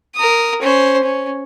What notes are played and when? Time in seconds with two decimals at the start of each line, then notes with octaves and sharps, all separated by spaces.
0.16 A#4 D#6
0.62 C#4 C5
1.03 C#4